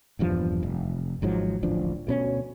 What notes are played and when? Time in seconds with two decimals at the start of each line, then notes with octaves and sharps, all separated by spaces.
0.19 D#1 E2 G2 F3
0.63 F1
1.22 G#1 G#2 F3 F#3
1.63 D1 A1 F3 D4
2.07 D2 B2 C#4